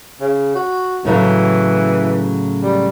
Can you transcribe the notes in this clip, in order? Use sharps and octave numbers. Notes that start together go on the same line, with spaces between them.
C#3
F#4
A2 C#3 E3 F#3
G3